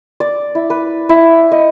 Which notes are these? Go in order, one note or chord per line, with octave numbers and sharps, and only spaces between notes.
D5
E4
B4
E4
D#5